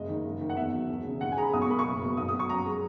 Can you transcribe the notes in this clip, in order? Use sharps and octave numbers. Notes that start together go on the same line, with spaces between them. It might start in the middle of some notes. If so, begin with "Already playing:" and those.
Already playing: F#1 G#3 D#5
D#3
F#1
D#3
F#5
E2 E5
F#3
E1
C#3
D#2 F#5
G#5
G#3 A#5
B5
B1 D#6
C#6
A#3 B5
C#6
F#1
B2
B1 D#6
D#6
F#3
C#6
F#2 A#5
G#3